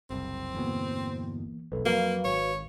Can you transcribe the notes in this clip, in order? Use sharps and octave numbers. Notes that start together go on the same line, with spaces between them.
F#1 C2 C4
G1 E2 B2 E3 A#3
E1 B1 A4 B4
F2 F#3 A#3 F#4 B4 F5
G#1 C#5